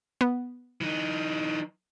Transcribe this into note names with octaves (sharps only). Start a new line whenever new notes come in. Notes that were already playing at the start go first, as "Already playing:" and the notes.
B3
E3 D#4